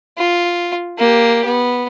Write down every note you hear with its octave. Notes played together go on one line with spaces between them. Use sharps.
F4
A#3 G4
B3